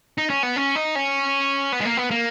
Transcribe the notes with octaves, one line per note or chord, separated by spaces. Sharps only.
D#4
C#4
B3
C#4
D#4
C#4
B3
G#3
A#3
B3
A#3